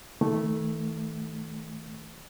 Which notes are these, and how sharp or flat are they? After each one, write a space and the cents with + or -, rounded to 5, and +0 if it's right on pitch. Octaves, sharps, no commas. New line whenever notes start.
D#3 +40 A3 +0